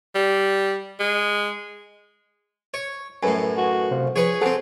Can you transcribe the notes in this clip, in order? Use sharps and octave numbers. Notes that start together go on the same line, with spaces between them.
G3
G#3
C#5
F#2 A2 A4 B4 G#5
F#4
C3 C5 F5
F3 G#4 B4 C#5
F3 C4 A4 F#5 G#5